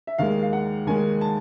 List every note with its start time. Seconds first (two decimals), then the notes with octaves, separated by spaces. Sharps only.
0.07 E5
0.18 D#2 D#3 G#3 F5
0.43 F5
0.53 F#5
0.86 D#2 D#3 G#3 G#5
1.21 A5